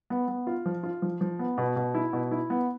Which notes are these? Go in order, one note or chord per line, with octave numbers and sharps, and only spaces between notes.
B3
B3
F4
F3
F4
F3
F3
B3
B2
B2
E4
B2
E4
B3